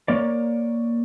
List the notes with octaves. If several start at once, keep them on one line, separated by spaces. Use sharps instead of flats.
A#3 C#5 D5